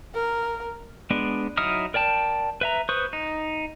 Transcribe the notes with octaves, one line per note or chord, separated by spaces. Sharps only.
A#4
G#3 B3 D4
F#3 D#4 E4 D#6 F6
A#4 D5 G5 A5
B4 E5 A#5
B4 C5 C#6 D#6
D#4